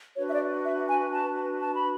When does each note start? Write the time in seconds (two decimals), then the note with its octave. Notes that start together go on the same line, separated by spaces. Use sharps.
0.16 D4 F#4 B4 C#5
0.28 E5
0.33 D5
0.64 E5
0.88 G#5
1.11 A5
1.59 A5
1.73 B5